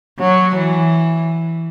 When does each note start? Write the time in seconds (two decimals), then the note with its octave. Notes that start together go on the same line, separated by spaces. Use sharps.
0.19 F#3
0.55 E3